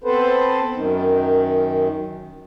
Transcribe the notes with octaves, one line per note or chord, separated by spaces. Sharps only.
B3 C4 A4 B4 C5
F#2 D#3